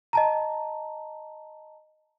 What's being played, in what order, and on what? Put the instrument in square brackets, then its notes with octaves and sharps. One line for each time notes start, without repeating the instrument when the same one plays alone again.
[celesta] D#5 A5 A#5